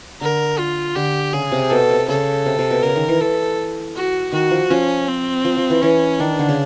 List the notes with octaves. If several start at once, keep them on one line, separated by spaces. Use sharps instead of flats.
D3 A#4
F4
D3 G4
C#3 G#4
C3
B2 A4
C3
C#3 A4
C3
C3
B2
C#3 A#4
D#3
E3
E3 A4
F#4
D#3 F#4
F3
F3 C#4
C4
F3
F3
E3
E3 C#4
D#3 D4
D3
C#3